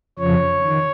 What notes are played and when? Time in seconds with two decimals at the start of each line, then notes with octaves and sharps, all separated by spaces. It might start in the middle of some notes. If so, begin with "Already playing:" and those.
0.19 F2 C#3 F3 C#5
0.62 D#3